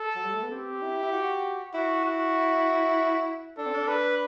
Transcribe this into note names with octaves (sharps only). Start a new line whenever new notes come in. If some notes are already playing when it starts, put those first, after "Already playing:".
Already playing: A4
F#3
G3
A3
B3
C4 G4
E4
E4
F#4
E4 F#4
F#4
D4 A4
C4
D4
B4